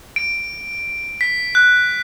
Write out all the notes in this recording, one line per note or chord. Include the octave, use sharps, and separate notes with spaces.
D7
B6
F#6